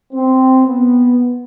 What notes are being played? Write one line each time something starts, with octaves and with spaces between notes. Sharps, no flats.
C4
B3